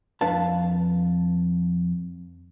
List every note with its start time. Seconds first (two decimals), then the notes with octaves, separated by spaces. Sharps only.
0.21 F2 D4 B4 F5 A5